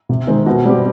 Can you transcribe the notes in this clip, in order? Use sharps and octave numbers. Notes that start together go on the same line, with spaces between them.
C3
D#3 G#3 C4
B2
G3 C4 G4